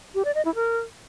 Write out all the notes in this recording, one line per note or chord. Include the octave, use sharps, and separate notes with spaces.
G4
D5
D#5
E4
A#4